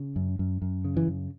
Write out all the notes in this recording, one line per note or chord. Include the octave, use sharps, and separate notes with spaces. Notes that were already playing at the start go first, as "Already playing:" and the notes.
Already playing: C#3
F#2
F#2
F#2
C#3
E3
F#2